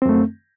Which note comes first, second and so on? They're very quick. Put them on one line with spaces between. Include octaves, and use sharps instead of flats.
C4 F#2 A3